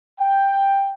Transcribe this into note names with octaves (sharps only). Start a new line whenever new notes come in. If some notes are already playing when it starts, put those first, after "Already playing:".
G5